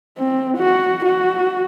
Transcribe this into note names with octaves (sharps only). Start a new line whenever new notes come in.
C4
F#4
F#4